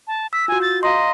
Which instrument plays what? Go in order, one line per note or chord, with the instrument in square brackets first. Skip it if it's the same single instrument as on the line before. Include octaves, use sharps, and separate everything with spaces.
[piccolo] A5
[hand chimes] E6 [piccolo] B6
[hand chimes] F4 F#4 [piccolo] G#5
[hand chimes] G6 [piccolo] A6
[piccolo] D#5 [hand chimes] F5 A#5 C6